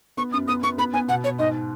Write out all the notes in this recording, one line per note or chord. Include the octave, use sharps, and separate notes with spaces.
B3 C#6
F#2 D#6
B3 D#6
B3 C#6
B3 B5
B3 G#5
B2 F#5
B2 C#5
G#2 D#5